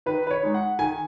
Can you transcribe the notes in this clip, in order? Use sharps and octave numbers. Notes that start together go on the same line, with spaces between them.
D#3 B4
B4
C#5
G#3 D#4
F#5
D#3 G#5